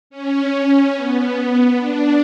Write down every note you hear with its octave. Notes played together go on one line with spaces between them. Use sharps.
C#4
B3
D4